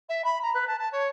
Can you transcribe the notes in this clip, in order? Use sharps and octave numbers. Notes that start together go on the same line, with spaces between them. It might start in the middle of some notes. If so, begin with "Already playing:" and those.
E5
B5
A#5
B4
A5
A5
C#5